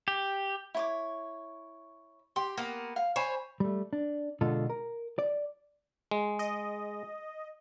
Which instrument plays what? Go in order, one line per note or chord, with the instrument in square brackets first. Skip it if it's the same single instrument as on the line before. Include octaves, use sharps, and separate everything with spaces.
[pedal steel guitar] G4
[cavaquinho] E4 C#5 D6
[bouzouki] G4 [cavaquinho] C6
[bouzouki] A#3 B3
[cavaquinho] F5
[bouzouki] C5 C#5 [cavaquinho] G#5 B5 C#6
[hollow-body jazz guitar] G3 A3
D4
B2 D3 G#3 F4 A4
A#4
D5
[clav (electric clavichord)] G#3
[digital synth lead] D#5